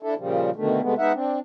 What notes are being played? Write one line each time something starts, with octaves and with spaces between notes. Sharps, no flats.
D4 E4 A4
A#2 C#3 F3 G3
B2 D3 D#3 A3
C3 G#3 A3 B3
G#3 B3 D#4 E5 F#5
C4 D4